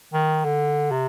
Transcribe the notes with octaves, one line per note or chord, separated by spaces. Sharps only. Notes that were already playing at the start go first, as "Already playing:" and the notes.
D#3
D3
C3